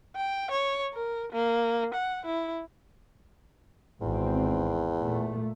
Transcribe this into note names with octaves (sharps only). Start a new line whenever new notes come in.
G5
C#5
A#4
A#3
F#5
E4
G#1 E2 C4
A#2 A3